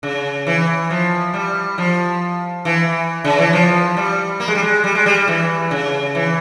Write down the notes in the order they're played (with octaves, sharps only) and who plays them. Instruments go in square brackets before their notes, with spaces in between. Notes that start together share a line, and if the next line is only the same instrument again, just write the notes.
[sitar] C#3
E3
F3
G3
F3
E3
C#3
E3
F3
G3
A#3
G#3
G3
G#3
G3
G#3
G3
E3
C#3
E3